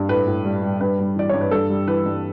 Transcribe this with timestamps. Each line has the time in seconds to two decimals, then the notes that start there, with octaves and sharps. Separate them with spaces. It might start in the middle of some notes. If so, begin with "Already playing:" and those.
Already playing: G2
0.09 A2 B4
0.27 A2
0.45 G3
0.63 G3
0.81 G2 B4
0.99 G3
1.16 E3 D5
1.29 G2 C#5
1.41 B4
1.51 G2 A4
1.70 G3
1.87 E3 B4
2.06 G2